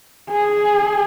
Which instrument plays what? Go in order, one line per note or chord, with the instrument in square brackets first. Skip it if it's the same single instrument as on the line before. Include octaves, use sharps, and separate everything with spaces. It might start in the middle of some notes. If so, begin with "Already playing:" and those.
[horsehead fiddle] G#4